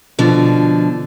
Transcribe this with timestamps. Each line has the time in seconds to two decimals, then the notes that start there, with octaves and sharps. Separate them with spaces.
0.18 B2 D3 F3